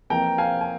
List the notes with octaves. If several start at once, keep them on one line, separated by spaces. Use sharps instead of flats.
F2 E3 A#3 G5 A#5
F5 G#5
G#5